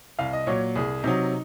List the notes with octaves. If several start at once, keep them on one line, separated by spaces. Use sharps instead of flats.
C2 F5
D#5
A#2 F#3 C#5
C2 G#4
C3 F#3 D#4